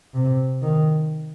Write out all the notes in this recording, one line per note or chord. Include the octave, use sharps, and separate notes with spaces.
C3
D#3